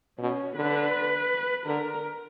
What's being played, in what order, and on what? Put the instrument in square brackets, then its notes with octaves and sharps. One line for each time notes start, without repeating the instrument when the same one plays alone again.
[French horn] B2 [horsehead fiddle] C#4
[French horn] D3 [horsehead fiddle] B4
[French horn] D3 [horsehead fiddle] A#4